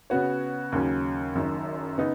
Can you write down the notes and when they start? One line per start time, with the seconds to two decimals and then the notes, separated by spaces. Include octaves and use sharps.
0.10 C#3 B3 F#4 C#5
0.72 D#2 C#3 F#3 C#4
1.35 F#1 F#2 D#3
1.98 C#3 B3 D#4